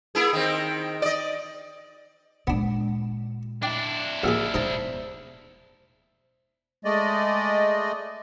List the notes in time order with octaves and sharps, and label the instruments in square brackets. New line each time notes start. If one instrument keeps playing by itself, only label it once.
[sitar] A#3 E4 G#4
D#3 C4
D5 D#5
[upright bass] A#2 G#3 [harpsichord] B3 D4
[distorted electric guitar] D4 E4 [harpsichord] G5 [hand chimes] D6
[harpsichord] A1 A#2 G#4 [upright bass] F3 [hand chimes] E6 F6 C#7
[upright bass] E1 B3 [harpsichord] D#4 D#5 A5 [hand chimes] C5
[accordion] G#3 A3 D5 D#5